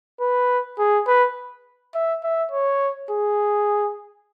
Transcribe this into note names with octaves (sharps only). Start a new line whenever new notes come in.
B4
G#4
B4
E5
E5
C#5
G#4